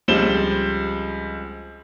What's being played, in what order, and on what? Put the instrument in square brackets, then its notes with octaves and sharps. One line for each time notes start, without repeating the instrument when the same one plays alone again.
[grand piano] C#2 F3 G3 C4 E7 G7